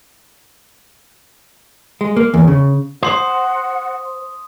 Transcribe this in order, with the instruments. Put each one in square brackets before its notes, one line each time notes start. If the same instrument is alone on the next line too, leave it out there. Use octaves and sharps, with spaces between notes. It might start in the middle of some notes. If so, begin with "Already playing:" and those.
[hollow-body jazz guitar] G#3
A#3
E2
C#3
[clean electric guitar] C5 [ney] F#5 [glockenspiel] C6 D#6